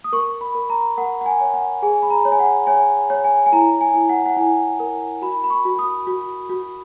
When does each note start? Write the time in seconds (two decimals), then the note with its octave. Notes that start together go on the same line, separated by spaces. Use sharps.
0.04 D#6
0.13 A#4 C#6
0.41 B5
0.55 A#4
0.70 A#5
0.98 A#4 F#5
1.21 F#5
1.26 G#5
1.41 C#5
1.54 F#5
1.82 G#4 G#5
2.02 B5
2.10 A#5
2.25 C#5
2.32 G#5
2.40 F#5
2.67 C#5 G#5
3.10 C#5
3.24 G#5
3.46 G#5
3.52 E4 A#5
3.81 G#5
3.94 E4
4.09 F#5
4.26 F#5
4.37 E4 G#5
4.80 A#4
5.22 F#4 B5
5.44 B5
5.50 C#6
5.65 F#4
5.79 D#6
6.07 F#4
6.49 F#4